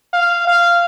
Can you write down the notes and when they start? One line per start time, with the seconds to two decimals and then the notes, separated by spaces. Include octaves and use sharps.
0.13 F5
0.47 F5